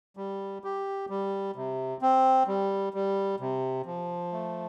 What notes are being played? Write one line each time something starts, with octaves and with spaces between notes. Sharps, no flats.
G3
G4
G3
C3
C4
G3
G3
C3
F3
A3